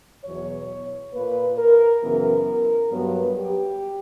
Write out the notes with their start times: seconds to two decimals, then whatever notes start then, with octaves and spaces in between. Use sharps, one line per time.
0.24 E2 B2 F#3 C#5
1.13 A#2 A#3 B4
1.58 A#4
2.02 F#2 C#3 E3 B3 A#4
2.91 G2 F#3 B3
3.36 G4